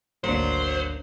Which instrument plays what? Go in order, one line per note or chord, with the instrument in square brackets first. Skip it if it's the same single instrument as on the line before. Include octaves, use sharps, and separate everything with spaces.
[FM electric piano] G#1 D2 [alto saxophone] F#3 [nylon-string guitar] A#3 D4 [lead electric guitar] C5